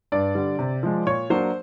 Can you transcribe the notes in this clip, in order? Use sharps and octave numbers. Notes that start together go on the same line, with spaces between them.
G2 D5
D3 G3
C3
F3 G#3
A#2 C#5
F#3 A#3 D4 C5